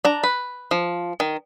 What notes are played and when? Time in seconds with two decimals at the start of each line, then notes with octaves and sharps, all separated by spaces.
0.05 D4 A#5
0.24 B4
0.71 F3
1.20 D#3